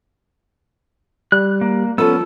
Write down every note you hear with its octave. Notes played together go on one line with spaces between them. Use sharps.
G3 F#6
A#3
F3 B3 C#4 A4 E6